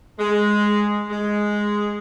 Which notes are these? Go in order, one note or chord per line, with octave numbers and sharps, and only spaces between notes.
G#3
G#3